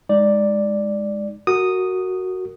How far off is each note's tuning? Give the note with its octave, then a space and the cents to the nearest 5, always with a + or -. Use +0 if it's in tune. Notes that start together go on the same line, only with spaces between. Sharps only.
G#3 -5 D#4 +0 D5 +0
F#4 +0 A#4 -20 D#6 -5